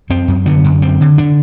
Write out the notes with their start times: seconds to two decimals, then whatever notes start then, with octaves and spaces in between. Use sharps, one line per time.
0.10 F#2 C4
0.28 F#2
0.46 D3 B3
0.64 F#2
0.82 D3 C4
1.01 D3
1.18 D3 D4